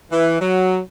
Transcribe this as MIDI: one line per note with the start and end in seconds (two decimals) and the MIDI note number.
0.11 0.38 52
0.40 0.79 54